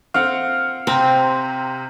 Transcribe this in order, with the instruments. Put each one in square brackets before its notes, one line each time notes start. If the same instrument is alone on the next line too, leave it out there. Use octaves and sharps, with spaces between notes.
[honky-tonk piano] C4 F#5 [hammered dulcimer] F5
[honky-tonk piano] C3 A#5 [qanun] C4